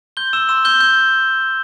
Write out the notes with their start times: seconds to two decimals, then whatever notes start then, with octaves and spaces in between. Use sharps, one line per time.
0.17 C6 G6 G7
0.33 E6 E7
0.49 C6 E6 E7
0.65 G6 G7
0.80 G6